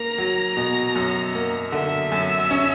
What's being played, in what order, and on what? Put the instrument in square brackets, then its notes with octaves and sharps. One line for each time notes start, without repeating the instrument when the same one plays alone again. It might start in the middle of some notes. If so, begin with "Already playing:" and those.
Already playing: [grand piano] A#3 [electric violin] A#5
[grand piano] F#3
B2
F#2
A#3
[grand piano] D3 [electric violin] E5
[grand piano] F#2
C#4